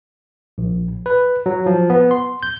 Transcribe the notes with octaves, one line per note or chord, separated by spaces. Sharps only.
A#1
B4
F#3
F3
B3
C6
G6